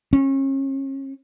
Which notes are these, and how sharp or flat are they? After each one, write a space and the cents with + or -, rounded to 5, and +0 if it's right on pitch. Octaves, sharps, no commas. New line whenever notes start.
C#4 -35